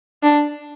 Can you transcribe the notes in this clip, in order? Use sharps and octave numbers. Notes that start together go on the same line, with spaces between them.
D4